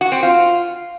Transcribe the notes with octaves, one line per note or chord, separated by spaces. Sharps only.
F#4
C4
F4